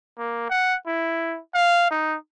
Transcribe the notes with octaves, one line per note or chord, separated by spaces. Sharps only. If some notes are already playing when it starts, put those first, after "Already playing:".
A#3
F#5
E4
F5
D#4